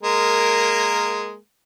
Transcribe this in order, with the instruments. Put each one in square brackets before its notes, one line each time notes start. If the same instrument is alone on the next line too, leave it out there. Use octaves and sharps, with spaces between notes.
[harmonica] G#3 A#3 A#4